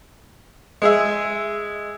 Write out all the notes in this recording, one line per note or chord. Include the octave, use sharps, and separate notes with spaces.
G#3 G#4 E5